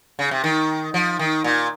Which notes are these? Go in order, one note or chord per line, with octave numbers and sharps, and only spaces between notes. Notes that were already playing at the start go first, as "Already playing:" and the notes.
C#3
C3
D#3
F3
D#3
A#2